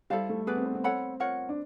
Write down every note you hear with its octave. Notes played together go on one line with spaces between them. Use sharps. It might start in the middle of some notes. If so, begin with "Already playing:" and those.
G3 E4 A4 C5 F5
A3
B3 G#4 B4 D5
C4
B3
C4
A4 C#5 F#5 B5
F4 A#4 C#5 F#5
D4